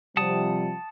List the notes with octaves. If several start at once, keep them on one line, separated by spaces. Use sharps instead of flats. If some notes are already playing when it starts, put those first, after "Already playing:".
C3 F3 G3 F#5 A5 D#6